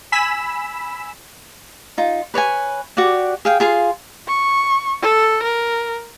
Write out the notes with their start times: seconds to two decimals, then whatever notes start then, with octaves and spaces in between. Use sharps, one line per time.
0.12 G#5 B5 E6 B6 E7
1.98 D#4 F4
2.34 B4 C#5 D5 G#5
2.97 F#4 G4 D5 F#5
3.45 G#4 F5 G5
3.60 F4 G#4 F5 C6
4.27 C#6
5.02 A4
5.43 A#4